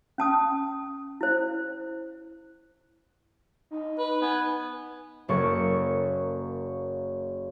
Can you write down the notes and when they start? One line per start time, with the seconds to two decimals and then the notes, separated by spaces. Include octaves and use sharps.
0.18 C#4 A5 D#6
1.21 E4 C5
3.71 D#4
3.98 B4
4.22 B3 G#5
5.28 F#1 A#3 A4 C#5 C#6